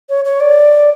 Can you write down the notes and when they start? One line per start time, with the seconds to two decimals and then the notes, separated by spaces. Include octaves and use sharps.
0.09 C#5
0.25 C#5
0.40 D5